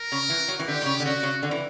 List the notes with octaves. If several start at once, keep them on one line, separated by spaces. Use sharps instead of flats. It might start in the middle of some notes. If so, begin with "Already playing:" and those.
Already playing: A#4
C#3
E3
F#3
E3
D3 G4
B2
C#3
D3
C#3 F#4
C#3
D3
E3